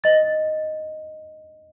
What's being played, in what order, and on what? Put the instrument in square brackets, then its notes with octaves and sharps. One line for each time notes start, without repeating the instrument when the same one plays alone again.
[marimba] D#5 A6